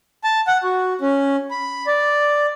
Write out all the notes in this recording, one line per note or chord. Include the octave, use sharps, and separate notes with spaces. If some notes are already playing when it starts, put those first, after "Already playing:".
A5
F#5
F#4
C#4
B5
D5